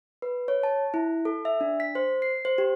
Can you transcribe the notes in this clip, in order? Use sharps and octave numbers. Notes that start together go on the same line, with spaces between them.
B4
C#5
A5
E4
A4
E5
D4
B6
C5
C7
C5
G4